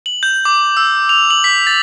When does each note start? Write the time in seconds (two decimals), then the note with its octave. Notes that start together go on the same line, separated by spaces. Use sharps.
0.06 F#7
0.23 G6
0.45 D6
0.77 E6
1.09 F7
1.30 F#7
1.44 B6
1.67 A6